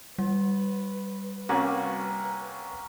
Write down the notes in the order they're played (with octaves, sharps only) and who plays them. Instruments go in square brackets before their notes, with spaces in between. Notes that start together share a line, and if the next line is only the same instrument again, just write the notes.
[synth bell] G3 [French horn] B4
[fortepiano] C2 C#4 F#4 [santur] A#3